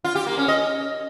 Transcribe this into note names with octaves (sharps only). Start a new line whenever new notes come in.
F4
G4
A#3
C#4
D#5